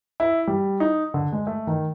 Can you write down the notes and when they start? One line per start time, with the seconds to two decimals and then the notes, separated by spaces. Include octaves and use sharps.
0.20 E4
0.47 G3
0.80 D#4
1.14 D3
1.32 G#3
1.47 A3
1.67 D#3